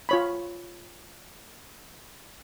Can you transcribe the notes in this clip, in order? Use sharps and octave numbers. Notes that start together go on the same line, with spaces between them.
F4 C#5 B5